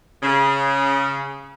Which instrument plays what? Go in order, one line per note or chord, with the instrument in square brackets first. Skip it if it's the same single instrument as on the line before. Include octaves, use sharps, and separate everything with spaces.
[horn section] C#3